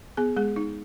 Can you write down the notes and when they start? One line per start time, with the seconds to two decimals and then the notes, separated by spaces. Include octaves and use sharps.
0.17 B3 G#4
0.37 G#3 G#4
0.56 D#4